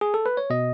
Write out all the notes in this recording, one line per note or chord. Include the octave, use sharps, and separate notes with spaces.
G#4
A4
B4
C#5
B2 D#5